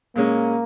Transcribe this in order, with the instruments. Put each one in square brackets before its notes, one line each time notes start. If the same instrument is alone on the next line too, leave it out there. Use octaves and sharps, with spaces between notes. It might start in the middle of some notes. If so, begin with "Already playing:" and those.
[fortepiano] A#2 G#3 C#4 [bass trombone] A#3